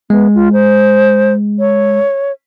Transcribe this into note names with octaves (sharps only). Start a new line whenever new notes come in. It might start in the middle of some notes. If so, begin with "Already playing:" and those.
G#3 B3
F4
C5
C#5